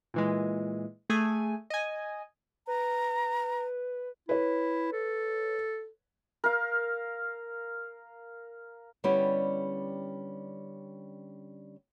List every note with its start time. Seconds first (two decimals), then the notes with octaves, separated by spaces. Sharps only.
0.14 A#2 E3 G#3
1.10 A3 G#4 G#5
1.70 D#5 G#5
2.67 B4 A#5
4.29 E4 B4 C#5
4.93 A4
6.44 A#4 F5
9.04 D3 G3 B3 C#4 E4 G4